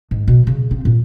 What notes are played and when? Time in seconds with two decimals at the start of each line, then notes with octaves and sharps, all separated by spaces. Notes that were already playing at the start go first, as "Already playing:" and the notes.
0.11 G#2
0.28 B2
0.47 C#3
0.71 C4
0.85 A#2